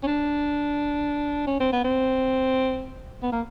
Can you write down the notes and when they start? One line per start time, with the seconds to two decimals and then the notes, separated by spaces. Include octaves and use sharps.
0.03 C#4
0.07 D4
1.47 C#4
1.60 C4
1.73 B3
1.84 C4
3.23 B3
3.32 A#3